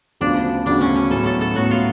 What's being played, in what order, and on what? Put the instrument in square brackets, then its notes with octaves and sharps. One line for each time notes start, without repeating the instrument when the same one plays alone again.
[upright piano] D2 C#3 F3 B3 F#4 [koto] D4
[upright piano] D2 C#3 F3 B3 F#4 [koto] D4
[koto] C#4
C#4
[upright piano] A2 F#3 B3 [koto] A4
[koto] A4
A4
[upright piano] A2 F#3 B3 [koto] F#4
[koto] F4